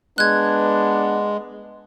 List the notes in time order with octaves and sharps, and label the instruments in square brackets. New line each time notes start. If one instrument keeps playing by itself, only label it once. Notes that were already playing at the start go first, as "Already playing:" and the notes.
[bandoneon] G#3 [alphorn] B3 [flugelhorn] D4 [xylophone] F#6 G#6